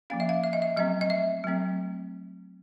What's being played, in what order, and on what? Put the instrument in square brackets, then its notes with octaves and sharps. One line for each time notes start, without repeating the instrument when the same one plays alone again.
[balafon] F3 A#3 C#4 F5
E5
F5
E5
D#5
E5
F#3 A3 C4 D#5
D#5
E5
F#3 A3 C4